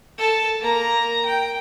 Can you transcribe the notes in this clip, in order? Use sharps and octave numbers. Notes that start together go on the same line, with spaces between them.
A4 A5
A#3 A#5
G5